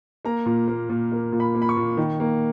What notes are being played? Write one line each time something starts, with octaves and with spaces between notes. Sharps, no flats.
A#3 A#5
A#2
A#3
A#2
A#3
A#2
B5
A#3
B5
C#6
A#2
D#3
A#3